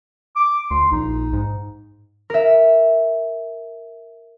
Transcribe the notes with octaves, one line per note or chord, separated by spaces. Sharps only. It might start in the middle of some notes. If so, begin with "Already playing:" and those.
D6
D2 C6
A#1 D#4
G#2
A#4 E5